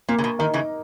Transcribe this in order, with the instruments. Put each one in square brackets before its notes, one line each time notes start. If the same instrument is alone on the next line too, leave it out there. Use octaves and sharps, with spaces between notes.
[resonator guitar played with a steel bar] A#2 [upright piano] A#3
[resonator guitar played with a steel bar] C#3
B2
[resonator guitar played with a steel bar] D#3 [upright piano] D#4 A#4
[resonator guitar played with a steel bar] C#3 E3